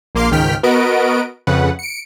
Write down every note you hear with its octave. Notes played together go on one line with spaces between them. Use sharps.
A#1 A#3 C6 D6 F6 C7
C#2 G#2 D#3 G5 F6 B6
B3 F#4 A#4 B4 D#5 D7
F2 C#3 B4 F#5
C#7 D7